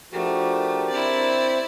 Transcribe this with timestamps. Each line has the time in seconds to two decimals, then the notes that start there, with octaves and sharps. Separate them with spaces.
0.13 F3 A3 D4 F#4 G4 A#4
0.90 C4 E4 C5 D5